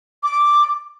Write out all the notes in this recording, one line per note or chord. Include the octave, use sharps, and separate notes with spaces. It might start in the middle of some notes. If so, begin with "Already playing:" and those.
D6